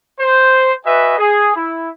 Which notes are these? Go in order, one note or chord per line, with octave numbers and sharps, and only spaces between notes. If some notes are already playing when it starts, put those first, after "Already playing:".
C5
F#4 B4 D#5 E5 G#5
G#4
E4